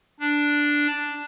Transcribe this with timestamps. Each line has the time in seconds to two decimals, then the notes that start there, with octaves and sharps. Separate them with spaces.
0.20 D4